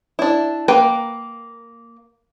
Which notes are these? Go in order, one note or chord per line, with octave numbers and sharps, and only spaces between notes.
D4 E4
A#3 A#4 B4 G5